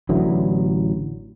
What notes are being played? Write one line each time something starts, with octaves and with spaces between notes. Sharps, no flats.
A1 D3 E3 F#3